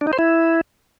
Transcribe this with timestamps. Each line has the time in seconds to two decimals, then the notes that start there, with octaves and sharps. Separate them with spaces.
0.01 D4
0.07 D#4
0.13 C5
0.19 E4